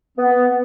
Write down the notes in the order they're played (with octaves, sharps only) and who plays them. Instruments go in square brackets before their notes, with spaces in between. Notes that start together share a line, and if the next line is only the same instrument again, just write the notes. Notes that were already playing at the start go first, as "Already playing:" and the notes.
[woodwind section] B3